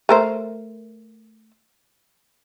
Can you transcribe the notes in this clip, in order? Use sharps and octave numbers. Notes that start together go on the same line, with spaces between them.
A3 A#4 C5